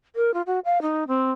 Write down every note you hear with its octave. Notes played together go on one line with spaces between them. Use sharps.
A#4
F4
F#4
F5
D#4
C4